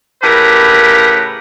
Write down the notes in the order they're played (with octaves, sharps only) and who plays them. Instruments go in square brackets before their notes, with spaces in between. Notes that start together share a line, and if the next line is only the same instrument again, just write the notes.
[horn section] A2 C#3 G4 A#4 B4